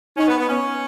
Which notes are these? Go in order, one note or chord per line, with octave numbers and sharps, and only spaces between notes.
C#4 D#4
B3
B3
B3 C#4